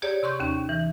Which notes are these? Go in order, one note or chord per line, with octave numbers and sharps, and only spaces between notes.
G4 G#4 C#5 D5
C3 C6 C#6 G6
D#2 C#4
E3